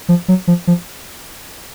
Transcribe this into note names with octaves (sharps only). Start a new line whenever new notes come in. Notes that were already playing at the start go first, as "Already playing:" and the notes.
F3
F#3
F3
F3